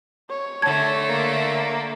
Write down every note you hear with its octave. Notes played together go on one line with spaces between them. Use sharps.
C#5
D3 A3 A5 G#6
A#3